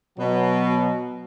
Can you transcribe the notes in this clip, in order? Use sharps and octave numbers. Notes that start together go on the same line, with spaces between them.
B2 F#3